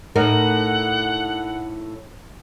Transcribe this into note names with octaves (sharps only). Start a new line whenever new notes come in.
A2 D#4 A#4 F#5